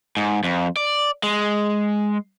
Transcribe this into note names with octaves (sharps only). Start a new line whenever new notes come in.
G#2
F2
D5
G#3